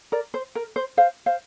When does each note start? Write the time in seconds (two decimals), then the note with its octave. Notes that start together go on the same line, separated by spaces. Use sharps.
0.12 A#4 D5
0.34 C5
0.55 A#4
0.76 C5
0.97 C5 F5
1.26 C5 F5